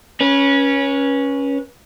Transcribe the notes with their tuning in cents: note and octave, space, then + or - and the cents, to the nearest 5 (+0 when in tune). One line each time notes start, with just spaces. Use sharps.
C#4 +0 B4 -30